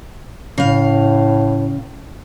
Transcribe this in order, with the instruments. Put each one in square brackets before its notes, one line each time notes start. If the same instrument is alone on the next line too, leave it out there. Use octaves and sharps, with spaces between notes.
[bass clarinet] A2 [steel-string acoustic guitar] C#3 F5